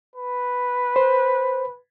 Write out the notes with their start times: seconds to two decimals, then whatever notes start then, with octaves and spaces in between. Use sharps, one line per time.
0.16 B4
0.96 C5